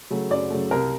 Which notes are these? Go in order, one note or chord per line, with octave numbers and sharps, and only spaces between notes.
C#3 F#3 A3
F#2 D5
C#3 F#3 A3
C2 A#4